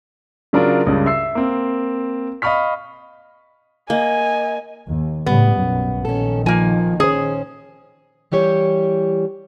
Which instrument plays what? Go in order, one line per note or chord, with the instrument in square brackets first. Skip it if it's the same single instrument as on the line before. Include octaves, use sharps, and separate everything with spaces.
[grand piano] C#3 F#3 D4 F4 A#4
C#2 G2 C#3
E5 E6 C7
A#3 C4
D#5 F5 B5 C#6 F6 B6
[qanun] A#3 [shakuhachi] D#5 [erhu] G#5
[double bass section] D#2
[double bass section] A2 C#3 G3 [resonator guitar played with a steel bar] B3
[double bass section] B1 F#2
[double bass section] A#1 D#3 [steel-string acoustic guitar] C#4 A4
[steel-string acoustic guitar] F3 [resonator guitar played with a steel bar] A#3 G#5
[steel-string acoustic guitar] C#4 C5 [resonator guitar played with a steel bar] G#4
[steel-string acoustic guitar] E3 G3 G4 C#5